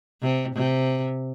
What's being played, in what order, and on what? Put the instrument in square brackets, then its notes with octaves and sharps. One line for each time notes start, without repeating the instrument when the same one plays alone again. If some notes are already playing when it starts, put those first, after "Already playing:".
[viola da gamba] C3
C3